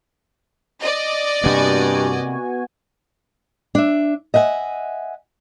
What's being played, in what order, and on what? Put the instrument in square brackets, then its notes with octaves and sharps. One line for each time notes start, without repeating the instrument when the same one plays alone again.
[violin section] D5 D#5
[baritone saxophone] G2 [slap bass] C3 A#3 [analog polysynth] B3 F#4 G#5
[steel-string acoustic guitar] D4 E5
D#5 E5 F#5 G#5